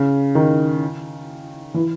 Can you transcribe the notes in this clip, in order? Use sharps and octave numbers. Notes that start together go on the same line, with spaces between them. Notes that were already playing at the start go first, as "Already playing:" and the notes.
Already playing: C#3
D#3
E3